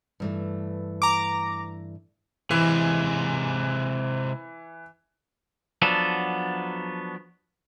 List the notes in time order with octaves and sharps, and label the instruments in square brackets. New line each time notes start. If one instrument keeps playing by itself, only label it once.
[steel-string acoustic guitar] G2 E3 A3
[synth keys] A#5 D6
[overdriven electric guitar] C3 G#3 [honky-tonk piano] E3
[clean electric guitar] F3 F#3 B3 D4 A4